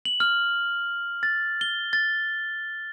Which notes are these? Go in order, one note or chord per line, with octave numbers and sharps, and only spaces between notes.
F#7
F6
A6
G7
A6